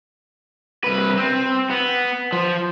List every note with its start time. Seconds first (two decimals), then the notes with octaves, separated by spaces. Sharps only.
0.84 C2 B4
1.18 C4
1.71 B3
2.32 F3